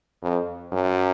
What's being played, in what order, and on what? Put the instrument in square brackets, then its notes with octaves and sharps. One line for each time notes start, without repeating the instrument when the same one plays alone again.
[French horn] F2
F#2